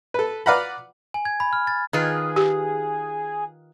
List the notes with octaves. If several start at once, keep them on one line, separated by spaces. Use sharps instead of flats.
A4 B4
B4 D5 F5 F#5 A#5 B5
G#5
G#6
B5
F6
A6
D#3 F4 G#4 B4
G4